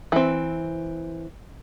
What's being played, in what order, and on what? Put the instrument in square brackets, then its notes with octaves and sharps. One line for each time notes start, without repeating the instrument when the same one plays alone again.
[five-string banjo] E3 C4